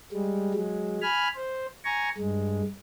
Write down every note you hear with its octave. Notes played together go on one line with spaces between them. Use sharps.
G3 G#3
F#3 G#3
G#5 B5 F6
C5
G#5 A#5 C#6
G2 G#3